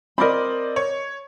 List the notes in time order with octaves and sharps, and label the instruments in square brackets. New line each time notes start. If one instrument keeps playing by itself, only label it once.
[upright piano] C4 D5 D#5 [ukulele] A#4 B5
[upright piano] C#5